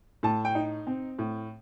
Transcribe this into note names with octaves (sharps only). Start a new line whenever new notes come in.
A2 A5
G5
D#4
C4
A2